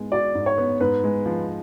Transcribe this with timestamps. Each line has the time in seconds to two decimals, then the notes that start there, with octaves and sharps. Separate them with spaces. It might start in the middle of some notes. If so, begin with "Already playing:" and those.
Already playing: G#2 G#3 B3
0.12 F#4 D5
0.35 G#2
0.46 C#5
0.58 B3
0.80 G#2 B4
1.04 G#3
1.26 F3